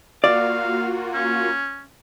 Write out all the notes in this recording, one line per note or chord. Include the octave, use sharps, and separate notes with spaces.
A#3 F4 F#4 D5 F5
C#4